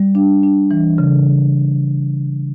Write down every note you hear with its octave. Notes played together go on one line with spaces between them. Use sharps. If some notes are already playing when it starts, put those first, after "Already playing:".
Already playing: G3
D4
D4
E3
C#3